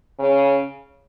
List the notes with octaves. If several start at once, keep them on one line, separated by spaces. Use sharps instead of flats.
C#3